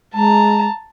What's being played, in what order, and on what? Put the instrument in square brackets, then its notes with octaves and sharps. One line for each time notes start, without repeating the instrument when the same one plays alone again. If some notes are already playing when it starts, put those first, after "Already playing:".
[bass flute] G#3 [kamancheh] A5 A#5